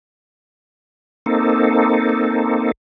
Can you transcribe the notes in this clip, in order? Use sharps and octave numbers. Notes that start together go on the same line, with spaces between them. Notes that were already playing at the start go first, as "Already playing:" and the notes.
A#3 C4 D#4 A4